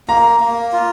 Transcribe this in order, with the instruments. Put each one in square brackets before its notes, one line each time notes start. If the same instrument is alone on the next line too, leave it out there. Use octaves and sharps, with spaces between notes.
[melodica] A#3 [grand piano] A#5
[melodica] A#3
F4